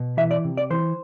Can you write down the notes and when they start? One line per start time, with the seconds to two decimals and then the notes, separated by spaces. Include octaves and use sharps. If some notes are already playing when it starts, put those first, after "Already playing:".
Already playing: B2
0.17 E3 E5
0.31 D5
0.44 C3
0.57 D5
0.70 E3 C5